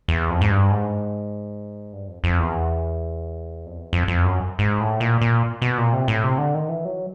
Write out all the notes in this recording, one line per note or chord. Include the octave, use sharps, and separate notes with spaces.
E2
F2
G#2
G2
G#2
G2
F2
F2
E2
F2
E2
F2
F2
F#2
G#2
A2
A#2
A#2
B2
A#2
C3
A2
C3
D3
D#3
E3
F#3